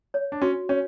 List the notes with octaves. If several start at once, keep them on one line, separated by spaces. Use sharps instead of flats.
C#5
D4
C#4 F#4
C#4 C#5